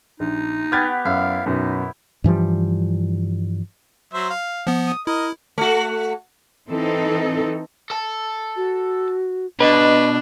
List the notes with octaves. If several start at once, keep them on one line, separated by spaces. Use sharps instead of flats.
A#1 D#4
B3 G4 F#5 F6 G#6 A6
F#2 E4 F5
F#2 B2 D#4
G2 E3 F3 G3
F#3 C5 E5
F5
F3 B3
D#6
E4 A#4 D#5
A3 F#4
E3 C4 D#4 A4
A4 A5
F#4
B2 D4 B4 D#5